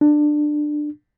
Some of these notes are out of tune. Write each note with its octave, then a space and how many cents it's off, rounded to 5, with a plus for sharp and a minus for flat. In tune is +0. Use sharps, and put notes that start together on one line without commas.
D4 +20